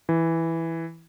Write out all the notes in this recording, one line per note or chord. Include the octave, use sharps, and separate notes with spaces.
E3